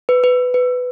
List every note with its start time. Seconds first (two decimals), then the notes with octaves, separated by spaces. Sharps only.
0.09 B4
0.24 B4
0.54 B4